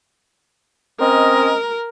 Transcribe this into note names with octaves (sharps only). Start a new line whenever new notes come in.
C4 C#4 A#4 D#5